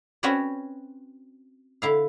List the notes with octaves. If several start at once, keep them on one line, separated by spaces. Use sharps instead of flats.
C4 C#4 F#4 B4 C#5 D5
D3 E4 F5